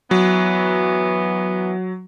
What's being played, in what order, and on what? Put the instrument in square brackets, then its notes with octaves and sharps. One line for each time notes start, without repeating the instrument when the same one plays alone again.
[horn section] E3 B3 [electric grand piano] F#3